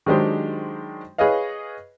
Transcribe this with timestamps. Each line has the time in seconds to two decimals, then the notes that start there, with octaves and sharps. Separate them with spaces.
0.06 D#3 F#3 G#3 D4 G4 C5
1.18 G#4 B4 C#5 D#5 F5